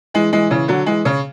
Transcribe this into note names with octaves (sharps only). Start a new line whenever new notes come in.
E3 G#3
E3 G#3
C#3 E3
D3 F#3
E3 G#3
C#3